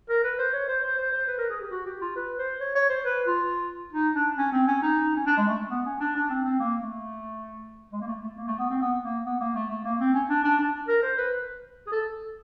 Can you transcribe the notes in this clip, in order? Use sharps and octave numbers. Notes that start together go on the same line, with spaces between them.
A#4
B4
C5
C#5
C5
C5
C5
C5
B4
A#4
G#4
G4
F#4
G4
F4
B4
C5
C#5
C#5
C5
B4
F4
D#4
D4
C#4
C4
C#4
D#4
C#4
D4
G#3
A3
B3
C#4
D4
D4
C4
C4
A#3
A3
G#3
A#3
A3
A3
A#3
A3
B3
C4
B3
A#3
B3
A#3
A3
A3
A#3
C4
C#4
D4
D4
D4
A#4
C5
B4
G#4
A4